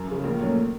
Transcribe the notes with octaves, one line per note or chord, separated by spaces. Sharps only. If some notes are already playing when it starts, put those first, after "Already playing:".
Already playing: F#2 A#4
C#3 F3
A#1 A#4
A#2 F#3 A3 C#4